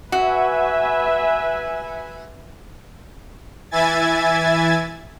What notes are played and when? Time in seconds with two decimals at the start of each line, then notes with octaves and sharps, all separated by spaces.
0.12 F#4 B4 E5 G#5
3.71 E3 E4 E5 G#5 G#6 A6